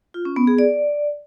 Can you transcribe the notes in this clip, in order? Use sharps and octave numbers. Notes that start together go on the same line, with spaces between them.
F4
C#4
B3
G#4
D5